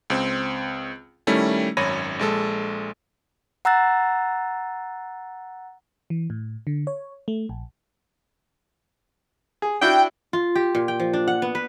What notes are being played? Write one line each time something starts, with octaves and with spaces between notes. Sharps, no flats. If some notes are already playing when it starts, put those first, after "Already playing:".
C#2 C4
D#3 G3 A3 C#4 E4
G#1 F#2 C#5 B5 A#6 D#7
A#1 G#3 A4
F#5 A#5 E6 F#6 A6
E3
A2
D3
C#5
A3
A#1
G#4
D4 E4 F#4 G5
F4
G4
A#2
G5
F3
D4
F#5
B3
B4